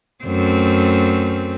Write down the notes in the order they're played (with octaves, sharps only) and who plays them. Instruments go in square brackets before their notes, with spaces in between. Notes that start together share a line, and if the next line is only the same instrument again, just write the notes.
[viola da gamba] F#2 A3 C4